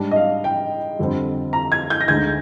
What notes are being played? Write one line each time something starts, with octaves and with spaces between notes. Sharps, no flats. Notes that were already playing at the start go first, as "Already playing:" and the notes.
Already playing: G#2 G3 D4
D#5
F5
G5
F2 D3 G3 C4
A#5
G#6
G6
A#6
D2 D3 G#3 D#4 G#6